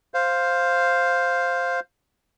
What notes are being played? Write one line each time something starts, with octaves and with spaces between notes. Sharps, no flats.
C5 F5